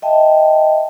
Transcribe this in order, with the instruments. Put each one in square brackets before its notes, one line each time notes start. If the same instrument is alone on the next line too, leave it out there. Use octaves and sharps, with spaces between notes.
[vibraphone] D#5 E5 G5 A5